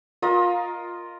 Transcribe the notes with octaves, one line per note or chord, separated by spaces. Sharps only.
F4 A#4 D#5